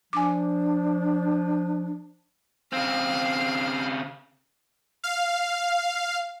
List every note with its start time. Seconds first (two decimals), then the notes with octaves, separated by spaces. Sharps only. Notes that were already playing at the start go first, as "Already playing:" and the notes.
0.13 F3 D4 G#5 D6
2.73 C#3 C4 F5
5.04 F5